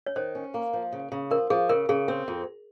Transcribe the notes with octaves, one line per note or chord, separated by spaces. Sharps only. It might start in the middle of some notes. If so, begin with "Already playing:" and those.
C#5
D#3 C5
C#4
A#3
F3
C#3
C#3
F3 A#4
F3 G#4
C#3 A#4
C#3 G#4
C4
F2